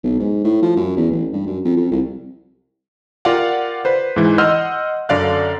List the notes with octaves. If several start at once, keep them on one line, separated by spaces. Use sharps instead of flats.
B1
G#2
A2
F3
F#2
E2
A1
G2
F#2
F2
F2
C2
F4 G4 A#4 D5 F5 F#5
B4 C5
G#2 E3
D#5 F#5 C6 E6 F6 G6
F#2 D3 D5 F5 F#6